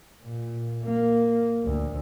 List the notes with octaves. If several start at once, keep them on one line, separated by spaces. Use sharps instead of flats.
A#2
A#3
D2